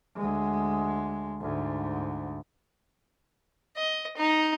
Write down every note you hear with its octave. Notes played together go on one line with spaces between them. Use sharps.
D2 G#3
D2 G#2
D#5
D#4